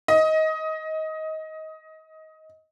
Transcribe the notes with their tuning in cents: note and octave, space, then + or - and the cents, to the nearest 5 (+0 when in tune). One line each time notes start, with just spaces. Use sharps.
D#5 +20